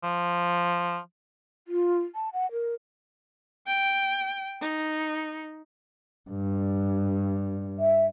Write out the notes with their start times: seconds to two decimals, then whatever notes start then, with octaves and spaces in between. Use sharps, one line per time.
0.03 F3
1.68 F4
2.15 A5
2.33 F#5
2.52 A#4
3.67 G5
4.62 D#4
6.30 G2
7.79 E5